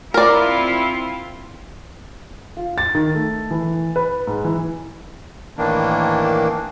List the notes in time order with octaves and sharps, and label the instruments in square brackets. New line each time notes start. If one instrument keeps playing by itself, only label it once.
[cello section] C4 E4 F4 [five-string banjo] A#4 D5
[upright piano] F4
A6
D#3
A3
E3
B4
G#2
E3
[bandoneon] A2 D#3 E3 A#3 D4